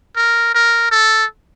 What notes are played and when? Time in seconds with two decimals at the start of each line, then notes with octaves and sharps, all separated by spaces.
0.16 A#4
0.54 A#4
0.91 A4